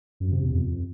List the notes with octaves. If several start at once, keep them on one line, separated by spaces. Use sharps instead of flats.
F#2
C3
E2
F2